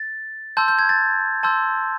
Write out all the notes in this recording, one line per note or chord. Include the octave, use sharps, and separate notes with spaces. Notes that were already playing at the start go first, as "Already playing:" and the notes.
Already playing: A6
A5 C6 E6 G6
G6
G#6
A6
A5 C6 E6 G6